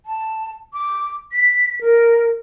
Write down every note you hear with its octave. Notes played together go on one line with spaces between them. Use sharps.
A5
D6
B6
A#4